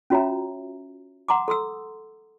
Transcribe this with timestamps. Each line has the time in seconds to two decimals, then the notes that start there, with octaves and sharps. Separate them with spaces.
0.10 C#4 F4 F#4 C#5 E5 A#5
1.29 F#5 A#5 C6 D6
1.48 A4 C6 D#6 E6